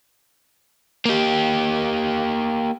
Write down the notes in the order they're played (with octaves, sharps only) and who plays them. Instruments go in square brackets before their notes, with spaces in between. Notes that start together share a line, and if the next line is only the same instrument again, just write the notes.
[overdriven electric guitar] A#3 G4